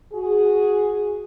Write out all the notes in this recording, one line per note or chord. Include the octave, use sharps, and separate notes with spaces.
F#4 G#4